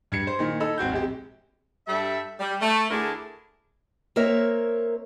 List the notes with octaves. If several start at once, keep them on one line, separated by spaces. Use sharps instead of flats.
G2 G#6 C#7
C5
A#2 D#3
D#4 A4 B5 E6
G#1 C4 F#4 G6
A#1 G#3 G4
G2 G3 A4 E5
G3
A3
D2 D3 D4 E4 G#4 A#4
A#3 C4 A#4 C#5 E5